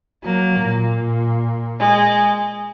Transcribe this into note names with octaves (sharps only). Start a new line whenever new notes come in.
F#3 A#3
A#2
G#3